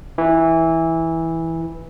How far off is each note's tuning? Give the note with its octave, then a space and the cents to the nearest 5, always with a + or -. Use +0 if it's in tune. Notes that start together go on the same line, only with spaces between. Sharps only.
E3 -10